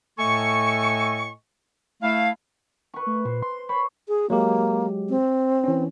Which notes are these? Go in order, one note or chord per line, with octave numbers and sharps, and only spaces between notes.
A2 A3 A4 D#5 G#5 C#6
A3 E4 F5
B4 C#6
A3
A#2 C5
C6
C5 C#5 B5
G#4
F#3 G#3 A#3 G4
C4
E3 C#4